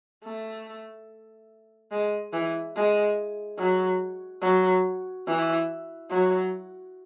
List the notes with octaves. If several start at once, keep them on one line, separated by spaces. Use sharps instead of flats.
A3
G#3
E3
G#3
F#3
F#3
E3
F#3